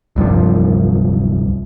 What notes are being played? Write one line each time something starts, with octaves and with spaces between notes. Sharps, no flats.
D1 C2 G2 F3